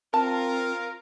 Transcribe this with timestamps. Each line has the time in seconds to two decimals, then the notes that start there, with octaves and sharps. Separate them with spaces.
0.14 C4 F4 A#4 A5